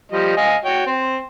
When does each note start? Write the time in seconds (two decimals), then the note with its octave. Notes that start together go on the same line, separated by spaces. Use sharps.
0.12 F3 G3 D#5
0.37 D#5 F5 G#5
0.65 F#4 C#5 G5
0.86 C4 C5